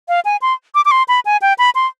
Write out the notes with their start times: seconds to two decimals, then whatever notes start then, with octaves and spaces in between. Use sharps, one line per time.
0.08 F5
0.25 G#5
0.42 C6
0.75 D6
0.85 D6
0.91 C6
1.08 B5
1.25 G#5
1.42 G5
1.58 B5
1.75 C6